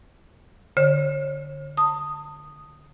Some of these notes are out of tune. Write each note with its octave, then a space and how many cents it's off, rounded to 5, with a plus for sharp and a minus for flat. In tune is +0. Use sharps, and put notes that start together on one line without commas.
D3 +0 C#5 -40
A5 +30 D#6 +0